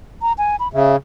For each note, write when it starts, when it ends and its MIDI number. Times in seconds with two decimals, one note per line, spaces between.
0.22 0.33 82
0.38 0.56 80
0.60 0.68 83
0.73 0.96 49
0.73 0.93 76